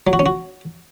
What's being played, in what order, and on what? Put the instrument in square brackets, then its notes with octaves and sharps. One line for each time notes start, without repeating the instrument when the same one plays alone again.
[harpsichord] F#3
F#4
C#4
F#4